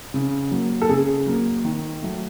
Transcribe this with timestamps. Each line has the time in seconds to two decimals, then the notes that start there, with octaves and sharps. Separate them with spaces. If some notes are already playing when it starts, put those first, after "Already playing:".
0.14 C#3
0.51 F#3 A#3
0.82 A4
0.89 C#3 G#4
1.26 F#3 A#3
1.65 D#3
2.02 F#3 A3